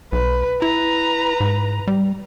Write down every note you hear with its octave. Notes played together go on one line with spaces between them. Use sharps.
B1 B4
E4 B4 A#5
G#2
G3